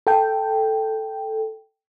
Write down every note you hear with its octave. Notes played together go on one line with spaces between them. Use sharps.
A4 G5